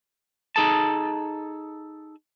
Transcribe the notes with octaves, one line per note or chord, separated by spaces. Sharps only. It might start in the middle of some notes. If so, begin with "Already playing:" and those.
D#4 G#4 A4 A5